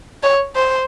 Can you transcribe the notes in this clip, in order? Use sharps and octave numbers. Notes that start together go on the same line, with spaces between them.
C#5
C5